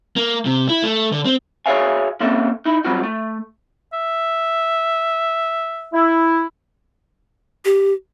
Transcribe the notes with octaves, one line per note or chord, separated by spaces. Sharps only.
A#3
C3
E4
A3
D3
C4
F#4 G#4 C#5 E5 F5 G#5
A#3 C4 C#4 A4 E5
D#4 E4
F#3 G3 C4 F4 F#4
A3
E5
E4
G4